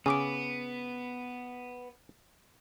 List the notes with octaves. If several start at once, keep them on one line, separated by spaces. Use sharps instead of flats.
C#3 B3 G#5 D6 D7